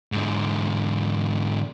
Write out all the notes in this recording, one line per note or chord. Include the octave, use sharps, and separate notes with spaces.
G#2 D3